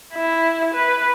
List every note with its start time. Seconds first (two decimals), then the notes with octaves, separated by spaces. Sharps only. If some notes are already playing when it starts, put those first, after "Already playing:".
0.13 E4
0.74 B4